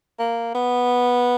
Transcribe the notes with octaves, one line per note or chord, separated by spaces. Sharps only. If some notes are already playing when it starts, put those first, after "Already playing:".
A#3
B3